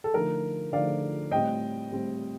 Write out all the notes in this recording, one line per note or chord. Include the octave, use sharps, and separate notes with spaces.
A4
D3 F3 A3 D#4 A#4
D3 F3 A3 D#4 D5 F5
A2 G3 C4 D#5 G5
A2 G3 C4